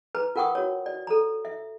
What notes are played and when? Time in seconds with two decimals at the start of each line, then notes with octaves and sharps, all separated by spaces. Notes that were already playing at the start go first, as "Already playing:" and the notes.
0.15 B4 A#5
0.36 F4 A#4 F#5 G5 C#6 D#6
0.55 F#4 C#5
0.86 D5
1.07 A4 A#5
1.45 E5